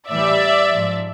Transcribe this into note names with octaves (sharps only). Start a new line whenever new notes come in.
A2 E3 G3 D5 E5
G#2 F3